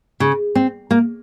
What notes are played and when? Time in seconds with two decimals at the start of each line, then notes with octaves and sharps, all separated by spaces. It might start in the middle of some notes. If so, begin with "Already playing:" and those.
0.20 C#3
0.55 C4
0.91 A#3